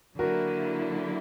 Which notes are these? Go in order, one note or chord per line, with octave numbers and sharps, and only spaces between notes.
D3 F#3 A#3 E4 F#4 A#4